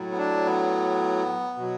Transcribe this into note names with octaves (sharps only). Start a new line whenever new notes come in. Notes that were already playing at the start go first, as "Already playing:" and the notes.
Already playing: A2 F#3
B3
D4
B3
B2 F#3